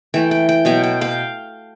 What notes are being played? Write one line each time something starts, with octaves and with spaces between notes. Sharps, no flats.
E3 A3 G5
G5
G5
B2 F#3 B3 G5
G5
F5 G5